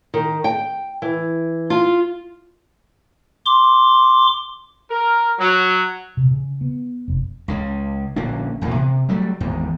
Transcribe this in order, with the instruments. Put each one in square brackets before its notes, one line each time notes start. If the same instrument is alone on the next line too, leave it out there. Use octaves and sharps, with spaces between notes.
[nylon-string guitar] D#3
G5
E3
F4
[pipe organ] C6 D6
[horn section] A#4
F#3
[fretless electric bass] C3
C#3
B3
F1
[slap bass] C#2 C#3
A#1 D3 A#3 C#4
A#1 E2 B2 A#3
C3
F#3 G3 A3
G#1 E2 G#2